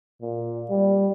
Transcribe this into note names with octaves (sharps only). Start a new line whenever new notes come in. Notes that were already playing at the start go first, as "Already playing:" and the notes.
A#2
G3